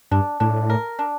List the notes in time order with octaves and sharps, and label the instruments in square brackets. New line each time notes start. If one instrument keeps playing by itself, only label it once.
[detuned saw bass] G2 [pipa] D4
[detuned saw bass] A2 [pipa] D4
[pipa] A#4
D4